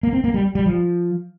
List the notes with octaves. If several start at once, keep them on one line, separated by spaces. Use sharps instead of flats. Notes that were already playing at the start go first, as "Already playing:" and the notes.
A#3
C4
A#3
G3
G3
F3